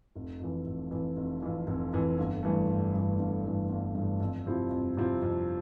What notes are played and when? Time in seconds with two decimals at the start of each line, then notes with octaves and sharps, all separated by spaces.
0.15 F1
0.40 F2 E3
0.66 F1
0.91 F2 E3
1.17 F1
1.42 F2 E3
1.67 F1
1.93 F2 E3
2.18 G1
2.43 G2 E3 A3
2.69 G1
2.94 G2 E3 A3
3.19 G1
3.44 G2 E3 A3
3.70 G1
3.95 G2 E3 A3
4.20 F2
4.46 C3 F3 C4 E4
4.71 F2
4.97 C3 F3 C4 E4
5.23 F2